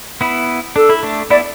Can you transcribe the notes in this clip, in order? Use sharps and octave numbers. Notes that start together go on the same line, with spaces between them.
B3 E4
D4 A4
E4
A3 D4
B3 E4 D5